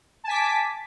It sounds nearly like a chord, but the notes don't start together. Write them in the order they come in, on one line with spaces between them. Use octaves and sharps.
A5 G#5 B6 D6